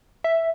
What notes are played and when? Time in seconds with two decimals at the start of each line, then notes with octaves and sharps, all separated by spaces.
0.24 E5